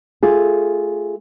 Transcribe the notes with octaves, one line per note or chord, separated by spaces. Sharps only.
A3 F4 G#4